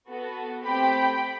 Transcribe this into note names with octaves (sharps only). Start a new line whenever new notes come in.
B3 F#4 A4
A3 C4 G4 G5 B5